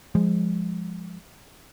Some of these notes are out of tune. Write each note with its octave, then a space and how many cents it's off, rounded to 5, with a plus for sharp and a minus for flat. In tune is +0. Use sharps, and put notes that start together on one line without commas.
F3 +0 G#3 -15